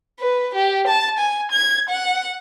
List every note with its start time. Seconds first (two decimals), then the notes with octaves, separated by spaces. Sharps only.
0.20 B4
0.55 G4
0.88 A5
1.18 G#5
1.52 G#6
1.89 F#5